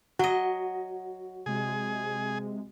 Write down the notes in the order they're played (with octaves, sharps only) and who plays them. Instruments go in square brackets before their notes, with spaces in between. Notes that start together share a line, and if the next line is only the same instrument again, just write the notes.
[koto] F#3 D#5 [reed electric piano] F#4 F#5
[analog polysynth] C3 G#3 [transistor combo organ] G#4